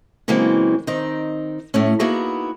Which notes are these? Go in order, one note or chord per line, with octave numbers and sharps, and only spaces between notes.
C#3 E3 F#3 G#3 A#3 C4
D#3 C4 D#4
A2 A3 C#4
A#3 B3 D#4 E4 F#4 G#4